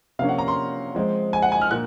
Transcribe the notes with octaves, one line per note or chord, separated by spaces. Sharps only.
C3 F3 A#3 C#4 F5
F#5
A#5
C6
F3 G#3 C4
G#5
F#5
G#5
F6
A#2 F#6